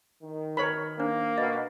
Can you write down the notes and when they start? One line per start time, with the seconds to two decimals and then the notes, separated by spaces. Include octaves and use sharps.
0.23 D#3
0.57 A#4 B4 C#5 B5
1.00 A#3 D4 C5
1.38 B2 D#5